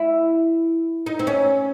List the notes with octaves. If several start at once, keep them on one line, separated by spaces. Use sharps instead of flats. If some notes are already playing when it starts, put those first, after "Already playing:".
Already playing: E4
D#4
C4
C#4